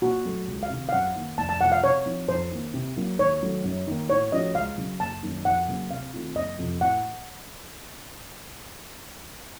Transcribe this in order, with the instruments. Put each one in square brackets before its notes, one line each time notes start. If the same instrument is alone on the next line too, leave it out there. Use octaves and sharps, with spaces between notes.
[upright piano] A#2 [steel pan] F#4
[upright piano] F#3 A3
C#2
[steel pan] F5
[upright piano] C3 D#3
[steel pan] F5
[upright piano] F#2 [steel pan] F#5
[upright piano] D#3 A#3
[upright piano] F1 [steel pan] A5
[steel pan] A5
[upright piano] F2 C3 F3 A3 [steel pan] F#5
[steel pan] F5
[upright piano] C3 [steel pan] C#5
[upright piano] F3 C4 D#4
[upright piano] F2 [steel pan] C5
[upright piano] D#3 A#3
C3
F#3 A#3
[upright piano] D#2 [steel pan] C#5
[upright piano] D#3 F#3 A3
F#2
D#3 A#3
[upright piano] A2 [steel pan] C#5
[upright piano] F3 A3 C#4 F#4 [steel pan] D#5
[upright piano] C#2 [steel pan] F5
[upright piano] C#3 F#3
[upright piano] F#1 [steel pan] A5
[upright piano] F#2 D#3 A#3 D#4
[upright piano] F2 [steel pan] F#5
[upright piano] C#3 F#3 A#3
[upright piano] C3 [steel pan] F5
[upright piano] D#3 A3 C4 F4
[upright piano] F#1 [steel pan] D#5
[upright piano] F2 C3
[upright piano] A2 [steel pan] F#5